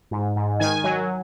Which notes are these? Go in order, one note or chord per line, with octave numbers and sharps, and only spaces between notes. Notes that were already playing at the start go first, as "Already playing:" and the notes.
G#2
G#2
D#3 G#5
F#3